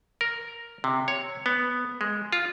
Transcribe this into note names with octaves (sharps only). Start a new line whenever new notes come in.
A#4
C3
C#5
B3
G#3
F4